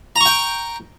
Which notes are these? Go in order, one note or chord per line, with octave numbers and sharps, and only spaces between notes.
G5 A#5 C#6